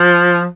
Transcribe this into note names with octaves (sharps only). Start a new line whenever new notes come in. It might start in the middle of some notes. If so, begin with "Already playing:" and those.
Already playing: F3